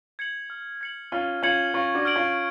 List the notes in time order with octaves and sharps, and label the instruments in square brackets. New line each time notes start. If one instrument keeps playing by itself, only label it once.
[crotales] G#6 C#7 F#7
F6
G#6 C#7 F#7
[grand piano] C#4 F4 [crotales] F6
[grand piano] C#4 F4 [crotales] G#6 C#7 F#7
[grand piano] C#4 F4 [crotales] C#6
[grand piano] D4 F#4
[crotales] F6 G#6 D7 F#7
[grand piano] C#4 F4